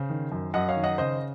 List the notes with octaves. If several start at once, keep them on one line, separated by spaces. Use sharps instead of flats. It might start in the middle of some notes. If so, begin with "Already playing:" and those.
Already playing: C#3 C5
D#3
F#2
F#2 D#5 F#5
C#5 F5
D#3
D#5 F#5
C#3 C5 D#5